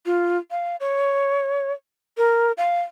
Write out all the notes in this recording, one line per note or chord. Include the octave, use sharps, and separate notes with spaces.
F4
F5
C#5
A#4
F5